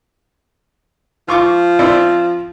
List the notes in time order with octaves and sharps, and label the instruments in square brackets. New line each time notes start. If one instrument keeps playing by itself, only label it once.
[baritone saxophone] F3 [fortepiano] F4 C#6 D6
[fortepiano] C4 E4 D5